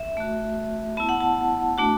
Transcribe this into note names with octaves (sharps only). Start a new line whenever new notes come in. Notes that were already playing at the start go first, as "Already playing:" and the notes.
Already playing: E5
A3 F#4
B3 E4 A5
F#5
A5
A3 D4 F#4